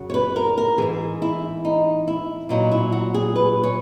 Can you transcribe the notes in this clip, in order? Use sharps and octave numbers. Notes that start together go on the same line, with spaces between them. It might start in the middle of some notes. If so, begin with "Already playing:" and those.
Already playing: F#2 C#3 F#3
C#5
B4
A#4
A#4
G#2 E3 G#4
E4
D#4
E4
A#2 F#3 D#4
E4
F#4
G#4
B4
C#5